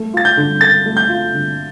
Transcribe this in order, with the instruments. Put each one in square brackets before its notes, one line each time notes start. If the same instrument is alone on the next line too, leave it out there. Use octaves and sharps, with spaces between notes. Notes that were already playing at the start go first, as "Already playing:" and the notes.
Already playing: [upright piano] A3
[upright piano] F4 [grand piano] A6
[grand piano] G6
[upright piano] D3
[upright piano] A4 [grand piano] A6
[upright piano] A3
[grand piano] G6
[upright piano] F4
D3